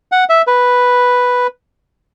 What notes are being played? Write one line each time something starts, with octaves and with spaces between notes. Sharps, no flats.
F#5
E5
B4